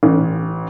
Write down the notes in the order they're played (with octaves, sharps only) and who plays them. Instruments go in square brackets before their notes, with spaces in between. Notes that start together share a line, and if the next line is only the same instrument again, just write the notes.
[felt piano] A1